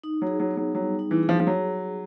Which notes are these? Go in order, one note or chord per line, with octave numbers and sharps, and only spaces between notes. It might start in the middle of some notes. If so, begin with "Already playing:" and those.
D#4
F#3
G#4
F#3
B3
F#3
F#3 G3
D#4
E3
G#4
F3
F3
F#3 G#4